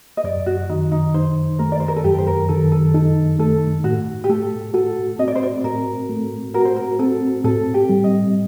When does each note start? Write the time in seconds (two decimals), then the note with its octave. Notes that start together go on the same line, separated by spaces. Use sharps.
0.17 D#5
0.24 F#2 D5
0.46 F#4
0.70 D#3 D#4
0.92 D#4
1.14 D#4 C5
1.59 A3 A#4
1.72 D5
1.80 C5
1.88 A#4
1.96 A4
2.04 F#2 G4
2.18 C5
2.27 A#4
2.49 D#3 A4
2.72 A4
2.94 D#4 A4
3.39 A3 A4
3.84 A2 F#4
4.24 G4
4.29 A3 A4
4.74 F#4 A4
5.19 C4 D#5
5.28 D5
5.35 C5
5.43 D5
5.64 A2 A#4
6.09 A3
6.54 F#4 A#4
6.65 C5
6.76 A#4
6.99 C4 A4
7.44 A2 A4
7.74 G4
7.89 G3
8.04 D#5